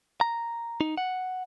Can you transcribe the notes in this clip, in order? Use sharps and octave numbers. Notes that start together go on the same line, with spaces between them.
A#5
D#4
F#5